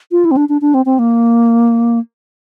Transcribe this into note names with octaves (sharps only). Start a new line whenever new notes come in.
F4
E4
C4
D4
D4
D4
C4
C4
A#3